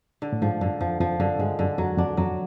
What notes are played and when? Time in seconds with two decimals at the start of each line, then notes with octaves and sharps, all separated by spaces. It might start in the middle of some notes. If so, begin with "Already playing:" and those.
0.22 D3
0.33 A2
0.42 G#2 F3
0.61 F#2 D3
0.81 F2 F3
1.00 F2 F3
1.20 F#2 D3
1.39 G2 G#3
1.59 F#2 D3
1.78 F2 F#3
1.98 F2 D4
2.17 F2 F#3